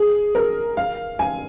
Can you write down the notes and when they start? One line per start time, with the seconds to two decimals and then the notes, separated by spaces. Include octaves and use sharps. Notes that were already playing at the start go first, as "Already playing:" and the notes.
Already playing: G#4
0.35 A#4
0.77 F5
1.19 G#5